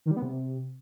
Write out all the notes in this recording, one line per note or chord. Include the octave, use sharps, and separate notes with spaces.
D#3
G3
B3
C3